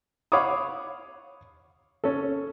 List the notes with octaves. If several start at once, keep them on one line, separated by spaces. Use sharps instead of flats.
C#5 F5 F#5 B5 D6 D#6
C#4 A4